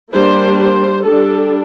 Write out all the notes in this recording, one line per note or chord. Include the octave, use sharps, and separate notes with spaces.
G3 A#3 D4 C5
C5
G3 D4 A4